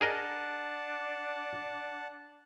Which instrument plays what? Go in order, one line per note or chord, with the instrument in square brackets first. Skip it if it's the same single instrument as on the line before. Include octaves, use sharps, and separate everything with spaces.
[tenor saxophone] D4 [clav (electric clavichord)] G#4 A#4 D#5 [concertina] F#5 A5